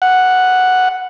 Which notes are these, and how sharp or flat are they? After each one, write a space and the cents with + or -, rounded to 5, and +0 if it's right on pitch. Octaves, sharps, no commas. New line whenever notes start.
F#5 +0